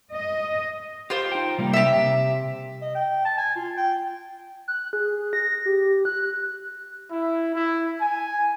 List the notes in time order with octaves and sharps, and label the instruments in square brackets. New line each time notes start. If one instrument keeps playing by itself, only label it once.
[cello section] D#5
[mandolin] F4 C5 [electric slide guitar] G4
[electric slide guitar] D#4 G5
C3 G3 A#3
[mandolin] G4 E5
[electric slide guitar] C3
[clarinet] D#5
G5
A5
G#5
F4
G5
[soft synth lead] F#6
G#4
A#6
G4
F#6
[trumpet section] E4
E4
G#5